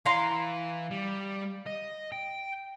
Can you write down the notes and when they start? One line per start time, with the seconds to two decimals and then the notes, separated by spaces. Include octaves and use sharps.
0.06 E3 F5 A#5 C6
0.91 G3
1.66 D#5
2.12 G5